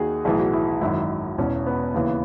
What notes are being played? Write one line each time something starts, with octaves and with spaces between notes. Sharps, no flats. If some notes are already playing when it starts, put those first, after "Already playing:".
Already playing: D#2 D#3 F#4 G#4
B1 A2 E3 G#4
F#4
E4
G#1 F#2 D#3 E4
E1 E2 B2 C#4
B3
D#2 C#3 E3